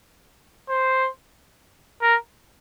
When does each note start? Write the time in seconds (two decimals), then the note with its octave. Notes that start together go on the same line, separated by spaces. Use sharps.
0.69 C5
2.02 A#4